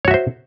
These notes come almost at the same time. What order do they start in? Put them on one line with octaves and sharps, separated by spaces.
C#5 F#4 E5 C5